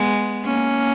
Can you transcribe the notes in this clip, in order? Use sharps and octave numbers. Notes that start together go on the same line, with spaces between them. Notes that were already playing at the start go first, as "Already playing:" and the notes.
Already playing: G#3 B3
A#3 C#4